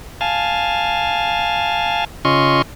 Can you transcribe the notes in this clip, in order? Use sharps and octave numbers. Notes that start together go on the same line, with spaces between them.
F5 G#5 A5
C#3 C#4 F4 D#5 C6 C#6